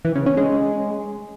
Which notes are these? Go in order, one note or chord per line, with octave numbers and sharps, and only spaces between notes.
E3
C#3
C#4
G#3